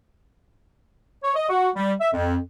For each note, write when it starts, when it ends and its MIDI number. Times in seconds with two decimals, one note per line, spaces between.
1.24 1.35 73
1.36 1.47 75
1.50 1.70 66
1.76 1.93 55
2.01 2.09 76
2.13 2.37 41